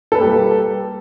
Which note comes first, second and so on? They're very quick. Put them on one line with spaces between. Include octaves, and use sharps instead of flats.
A4 B4 A#3 G4 G3